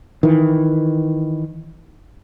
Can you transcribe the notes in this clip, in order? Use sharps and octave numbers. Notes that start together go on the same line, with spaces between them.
D#3 E3